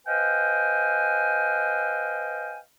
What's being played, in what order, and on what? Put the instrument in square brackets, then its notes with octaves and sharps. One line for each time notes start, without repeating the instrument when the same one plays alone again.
[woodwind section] B4 C5 D#5 F5 G5 G#5